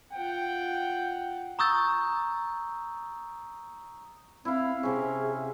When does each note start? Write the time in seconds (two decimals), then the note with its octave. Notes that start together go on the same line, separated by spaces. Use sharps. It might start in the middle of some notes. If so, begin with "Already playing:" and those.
0.13 F4 F#5 G5
1.59 A#5 C#6 D#6 E6 G6 A6
4.45 C4 E4 F5
4.83 C3 C#4 G#4